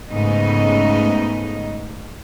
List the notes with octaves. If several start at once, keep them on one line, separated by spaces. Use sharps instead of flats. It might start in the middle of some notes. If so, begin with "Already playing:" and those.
G#2 C#3 A3 B3 D#4 D#5